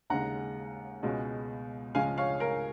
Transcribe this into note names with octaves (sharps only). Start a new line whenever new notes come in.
D#2 C#3 G#3 F#5 A#5
C#2 B2 G#3 C#4
C#2 C#3 F3 G#3 C#4 F5 G#5
C#5 F5
A#4